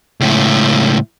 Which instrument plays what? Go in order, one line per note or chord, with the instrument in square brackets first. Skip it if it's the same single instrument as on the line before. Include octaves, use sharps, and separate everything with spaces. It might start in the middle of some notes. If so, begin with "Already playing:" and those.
[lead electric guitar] C#2 A2